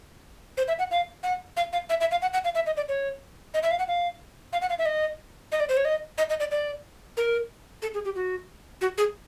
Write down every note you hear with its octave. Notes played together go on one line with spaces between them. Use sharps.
C5
E5
F#5
F5
F#5
F5
F5
E5
E5
F5
F#5
F#5
F5
E5
D#5
D5
C#5
D#5
E5
F5
F#5
F5
F5
F#5
F5
E5
D#5
D#5
D5
C5
C#5
D#5
D#5
D#5
D5
D5
A#4
A4
G#4
G4
F#4
F#4
G#4